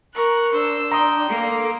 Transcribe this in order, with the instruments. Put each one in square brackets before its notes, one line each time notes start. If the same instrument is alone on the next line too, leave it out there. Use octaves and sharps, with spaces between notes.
[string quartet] A#4 C#6 F#6
[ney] D4 [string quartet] C5 E6
[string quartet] G5 [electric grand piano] A#5 C6 D#6
[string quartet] A#3 [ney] A4